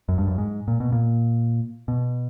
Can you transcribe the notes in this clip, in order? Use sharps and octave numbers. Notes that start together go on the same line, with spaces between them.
F#2
G2
F#2
G#2
A#2
B2
A#2
B2